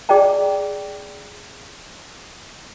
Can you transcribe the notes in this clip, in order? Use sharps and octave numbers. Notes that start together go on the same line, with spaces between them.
G#4 D5 D#5 G5 A#5